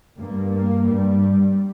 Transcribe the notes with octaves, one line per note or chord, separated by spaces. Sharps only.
G2 A#3
A#3
G2 G3